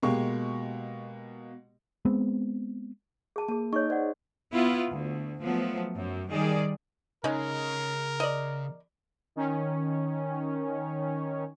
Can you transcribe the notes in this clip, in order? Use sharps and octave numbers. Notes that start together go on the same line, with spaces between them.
B2 G#3 A#3 G4 C#6
G#3 B3 C4
G#4 A5
A#3 G#4 A5
D#4 G#4 C#5 D#5 C#6
C5 D5 F#5
B3 E4 F4
D2
F3 F#3 A3 B3
F#2
D#3 G3 G#4 D5
C#3 G#3 C#4 D#4 A#4
D5 D#5
D#3 C#4